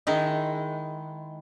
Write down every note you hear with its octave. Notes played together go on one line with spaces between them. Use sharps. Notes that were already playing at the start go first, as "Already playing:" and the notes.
D#3 G#3 D#4 E4